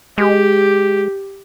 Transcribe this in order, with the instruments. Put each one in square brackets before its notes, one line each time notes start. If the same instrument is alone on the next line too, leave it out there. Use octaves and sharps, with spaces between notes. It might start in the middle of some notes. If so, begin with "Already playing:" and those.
[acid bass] G#3 [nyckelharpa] G4